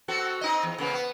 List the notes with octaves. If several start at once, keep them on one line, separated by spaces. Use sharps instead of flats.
C4 F#4 A4
C4 D#4 D#5
E2
C#3 A#3 B3
B3